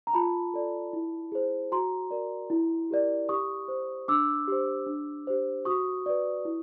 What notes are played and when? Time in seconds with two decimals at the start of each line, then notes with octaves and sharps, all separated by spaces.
0.07 A#5
0.13 F4 A5 B5
0.54 A4 D5
0.93 E4
1.32 G#4 C5
1.72 F#4 A#5 C6
2.11 A#4 D5
2.50 E4
2.90 G4 A#4 D5
3.29 G4 C#6 D#6
3.68 C5
4.08 D4 D6 E6
4.47 G4 C5
4.87 D4
5.27 G4 C5
5.65 F#4 C#6 D#6
6.06 B4 D5
6.45 E4